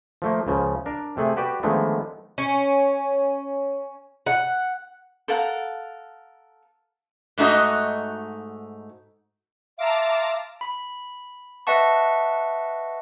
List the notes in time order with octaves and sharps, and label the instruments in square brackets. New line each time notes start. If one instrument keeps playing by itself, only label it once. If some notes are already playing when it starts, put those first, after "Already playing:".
[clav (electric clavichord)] F3 A3 A#3
C#2 C#3 F3
D4 A#4
C3 A3 G#4
F#4 G4 B4 D5 G5
D3 D#3 F3 G#3 A3 B3
[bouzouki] C#4
F#5
[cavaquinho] A4 A#4 F5 F#5
[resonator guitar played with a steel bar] G#2 A3 D#4 F#4 D#5
[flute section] E5 F5 C6 [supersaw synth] A5 A#5 D6
[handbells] B5
B4 D#5 E5 F#5 A5 C#6